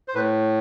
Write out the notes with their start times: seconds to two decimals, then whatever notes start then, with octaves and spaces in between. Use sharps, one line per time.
0.08 C5
0.15 A2 B4